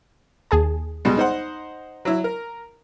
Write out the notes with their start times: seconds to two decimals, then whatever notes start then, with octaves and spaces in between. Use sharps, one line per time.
0.51 D#2 G#4 A5
1.05 B2 G3 G#3
1.17 D#4 C5 F#5
2.05 F#3 E4
2.24 A#4